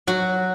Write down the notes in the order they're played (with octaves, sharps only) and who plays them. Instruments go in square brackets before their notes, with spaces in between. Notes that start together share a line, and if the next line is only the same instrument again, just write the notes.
[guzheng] F#3 F#4